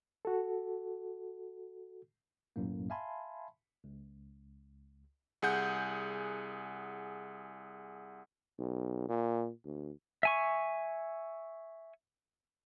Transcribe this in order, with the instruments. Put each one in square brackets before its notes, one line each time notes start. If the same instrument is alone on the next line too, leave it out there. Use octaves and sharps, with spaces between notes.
[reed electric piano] F#4 A4
[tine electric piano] B1 F#2 A2 A#3
E5 F5 G#5 A5 B5 C6
C#2
[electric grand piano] C2 G#4 F#5 G6
[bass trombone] B1
A#2
D2
[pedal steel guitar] E5 G#5 C#6